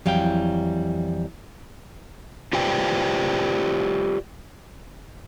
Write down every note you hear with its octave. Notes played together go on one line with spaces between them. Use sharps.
F2 E3 F#3 G3 F5 G5
F4 G4 B4 C5 D5 G5